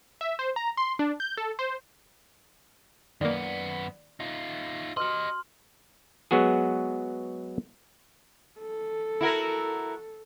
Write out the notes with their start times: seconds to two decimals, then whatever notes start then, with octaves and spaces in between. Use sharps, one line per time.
0.21 E5
0.39 C5
0.56 A#5
0.77 C6
0.99 D4
1.20 G6
1.38 A4
1.59 C5
3.21 F#2 D#3 A#3 B3 D5
4.20 D#4 F4
4.97 F#4 G4 B4 D#5 C6 F6
6.31 F#3 G#3 B3 F#4 G#4
8.60 A4
9.21 E4 F#4 A#4